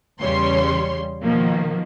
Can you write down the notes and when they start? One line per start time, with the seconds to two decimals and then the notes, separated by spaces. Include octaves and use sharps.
0.21 E2 C#3 G3 C#5 C6
1.23 B2 D#3 F3 A#3